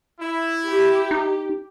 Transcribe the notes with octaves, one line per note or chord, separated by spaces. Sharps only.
E4
G4
D#4